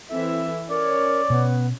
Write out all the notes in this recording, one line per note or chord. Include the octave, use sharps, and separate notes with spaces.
E3 C4 A4 E5
C#4 A#4 C#5 D5
B2 B3